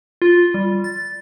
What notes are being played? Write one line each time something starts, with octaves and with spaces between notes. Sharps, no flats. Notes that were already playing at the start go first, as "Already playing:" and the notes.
F4
G3
A6